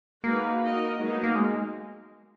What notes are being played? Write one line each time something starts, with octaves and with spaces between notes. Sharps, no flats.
G#3 A#3 D#4 F#4 B4
D#4 F#4 A#4 D#5
F#3 G#3 B3 D#4
A#3
A#3
G#3